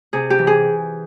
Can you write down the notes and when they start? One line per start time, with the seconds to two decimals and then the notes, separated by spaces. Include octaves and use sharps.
0.13 C3 G#4
0.30 G4
0.39 E3
0.47 G#4